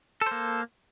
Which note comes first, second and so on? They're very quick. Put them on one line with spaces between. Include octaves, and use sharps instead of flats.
A4 C5 A#3